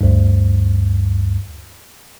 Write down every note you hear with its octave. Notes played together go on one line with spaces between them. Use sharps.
D2 G2